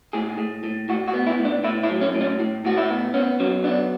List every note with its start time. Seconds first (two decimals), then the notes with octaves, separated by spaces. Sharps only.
0.13 A2 G#4
0.38 A2
0.64 A2
0.89 A2 F#4
1.08 F#4
1.14 B3
1.27 E4
1.39 A2
1.45 D4
1.64 A2 E4
1.83 E4
1.90 F#3
2.01 C#4
2.15 A2
2.21 C#4
2.40 A2
2.65 A2 F#4
2.78 E4
2.90 B3
3.14 B3 C#4
3.40 F#3 C#4
3.64 B3 D4